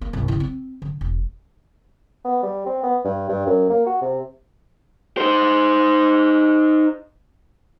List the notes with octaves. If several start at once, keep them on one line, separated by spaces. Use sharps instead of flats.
A#3
C2 G2
C#3 E4
C4
D3
E1
B3
G3
C4
B3
G2
G2
F#2
A#3
F#4
C3
D#4 C5